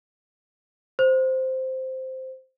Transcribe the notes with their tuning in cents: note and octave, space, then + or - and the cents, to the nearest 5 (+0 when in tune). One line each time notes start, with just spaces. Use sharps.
C5 -5